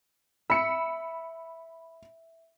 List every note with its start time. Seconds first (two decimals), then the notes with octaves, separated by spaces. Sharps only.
0.50 E5 B5 C#7